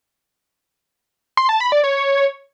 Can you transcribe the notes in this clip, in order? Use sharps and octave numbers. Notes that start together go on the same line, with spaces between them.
C6
A5
B5
D5
C#5